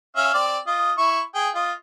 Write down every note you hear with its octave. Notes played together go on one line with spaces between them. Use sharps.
C#4 E5 F5
C4 D5
F4 D#5
E4 C#6
G#4 G5
F4 D#5